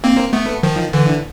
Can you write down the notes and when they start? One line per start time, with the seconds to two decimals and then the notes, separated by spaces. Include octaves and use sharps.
0.04 A#3 C4
0.33 A3 B3
0.63 D#3 F3
0.93 D3 E3